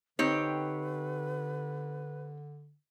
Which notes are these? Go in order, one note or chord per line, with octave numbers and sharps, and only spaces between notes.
D3 C4 D#4 G4 B4 C#5